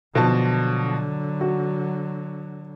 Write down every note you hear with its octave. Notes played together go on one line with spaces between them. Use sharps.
B2 D3 F3 F#3 A5
F#4